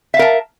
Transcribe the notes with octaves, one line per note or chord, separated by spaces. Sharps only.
A#4 E5 F5 A5